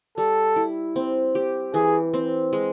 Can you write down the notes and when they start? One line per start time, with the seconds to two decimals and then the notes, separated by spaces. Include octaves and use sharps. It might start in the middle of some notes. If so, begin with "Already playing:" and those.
0.18 G3 A4
0.56 E4
0.96 C4
1.35 G4
1.74 E3 G#4
2.14 C4
2.53 G#3